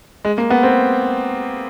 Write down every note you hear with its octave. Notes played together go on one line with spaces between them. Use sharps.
G#3
A#3
B3
C4